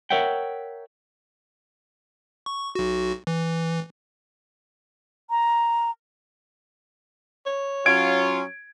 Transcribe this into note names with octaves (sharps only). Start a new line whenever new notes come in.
A#4 C#5 E5 F#5 G5
C#6
B1 F#4
E3
A#5
C#5
F#3 C#4 F4 G#6 D7